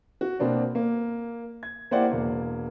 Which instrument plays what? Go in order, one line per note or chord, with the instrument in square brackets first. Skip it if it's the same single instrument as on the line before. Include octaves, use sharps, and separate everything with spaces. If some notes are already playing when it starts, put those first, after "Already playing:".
[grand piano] F#4
B2 A#3 C4 D4
A#3
G#6
A#3 E4 G4 C5 D5 F#5
E1 A#3